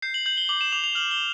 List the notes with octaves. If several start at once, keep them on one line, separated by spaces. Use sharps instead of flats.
G6 C7
F#7
G6 F#7
G7
D6 F#7
E7
D6 F7
F7
F6 F#7
G7